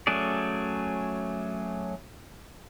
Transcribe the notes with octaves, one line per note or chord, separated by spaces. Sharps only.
F#3 A3 C#4 G#4 D5